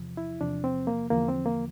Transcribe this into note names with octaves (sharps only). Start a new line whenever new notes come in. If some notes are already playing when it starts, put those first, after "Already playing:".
Already playing: E2 C3 F3
E4
E2 C3 F3 D4
C4
A#3
E2 D3 F3 A#3
C4
A#3